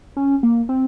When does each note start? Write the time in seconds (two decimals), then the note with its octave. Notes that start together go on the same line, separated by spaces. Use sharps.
0.17 C#4
0.43 A#3
0.69 C4